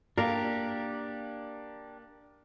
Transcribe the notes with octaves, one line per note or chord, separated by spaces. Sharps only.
A#3 D4 G4 A#4 F5